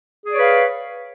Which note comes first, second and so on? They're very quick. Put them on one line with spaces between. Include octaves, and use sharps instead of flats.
G#4 D5 C#5 B4 F5